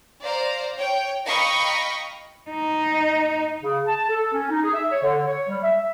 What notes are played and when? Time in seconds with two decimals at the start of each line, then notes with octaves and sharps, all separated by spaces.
0.22 C5 D5 F5 A#5
0.77 C#5 G5
1.25 D#5 F5 G5 A#5 B5 C#6
2.50 D#4
3.61 C#3
3.86 A5
4.09 A4
4.33 C#4
4.50 D#4
4.62 G#4
4.74 E5
4.90 C#5
5.03 D3
5.26 C#5
5.48 G3
5.63 E5